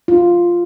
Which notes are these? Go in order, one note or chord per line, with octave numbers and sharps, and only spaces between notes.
F4